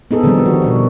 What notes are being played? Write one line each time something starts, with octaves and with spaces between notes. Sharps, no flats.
B3 D#4 G#4 A4
D3 D#3 F3 G3 B3 C4
D#3 G3 F#4
B2 D3 D#3